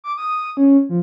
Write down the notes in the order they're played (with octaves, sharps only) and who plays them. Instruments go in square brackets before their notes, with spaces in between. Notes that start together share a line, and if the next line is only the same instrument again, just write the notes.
[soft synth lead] D6
D#6
C#4
F3